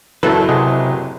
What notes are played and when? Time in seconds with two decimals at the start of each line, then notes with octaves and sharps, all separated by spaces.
0.23 F#1 F#3 E4 A4 B4
0.49 C3 G#4 D#5 F#5